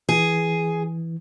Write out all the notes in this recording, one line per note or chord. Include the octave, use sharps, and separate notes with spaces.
E3 G#4